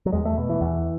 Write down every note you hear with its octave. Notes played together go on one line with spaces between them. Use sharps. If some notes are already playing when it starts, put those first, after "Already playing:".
F#3
E2 G#3
A3
B2
E3
E2